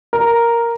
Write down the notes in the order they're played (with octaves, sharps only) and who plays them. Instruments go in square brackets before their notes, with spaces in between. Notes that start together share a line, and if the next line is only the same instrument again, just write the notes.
[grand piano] A#4